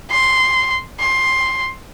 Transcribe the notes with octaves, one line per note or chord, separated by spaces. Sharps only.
C6
C6